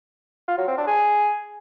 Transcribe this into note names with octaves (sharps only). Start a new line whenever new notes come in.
F4
F#3
C4
D4
G#4